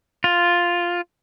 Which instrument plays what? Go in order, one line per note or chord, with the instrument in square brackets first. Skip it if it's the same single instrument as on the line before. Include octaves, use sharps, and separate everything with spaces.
[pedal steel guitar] F4